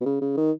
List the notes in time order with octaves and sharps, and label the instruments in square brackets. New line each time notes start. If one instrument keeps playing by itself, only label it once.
[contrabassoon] B2
C#3
C#3
D#3